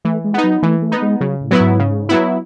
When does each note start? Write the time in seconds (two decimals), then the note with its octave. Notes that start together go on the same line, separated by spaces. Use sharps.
0.05 E3 A3
0.24 G#3
0.34 B3 D#4
0.44 F#3
0.63 E3 A3
0.82 A3
0.92 B3 D#4
1.02 G#3
1.21 C#3 F#3
1.41 A2
1.51 F#3 B3 E4
1.60 G#2
1.79 C#3
2.09 F#3 B3 E4